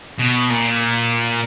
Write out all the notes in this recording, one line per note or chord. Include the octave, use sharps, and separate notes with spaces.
B2
A#2